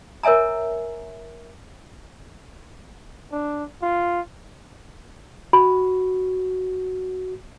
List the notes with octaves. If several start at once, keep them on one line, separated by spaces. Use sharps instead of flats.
A#4 C#5 E5 G#5 A#5
D4
F4
F#4 B5